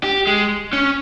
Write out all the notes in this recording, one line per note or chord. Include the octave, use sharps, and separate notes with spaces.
G4
G#3
C#4